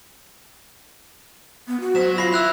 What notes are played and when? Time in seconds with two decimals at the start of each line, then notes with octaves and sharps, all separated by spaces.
1.67 B3
1.80 F#4
1.95 F#3 C5 B6 E7
2.18 F4 B5 A#6 C7
2.33 E4 E6 F#6 F7